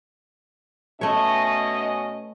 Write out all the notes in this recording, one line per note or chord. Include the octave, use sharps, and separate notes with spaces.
B2 A3 C#4 C#5 D#5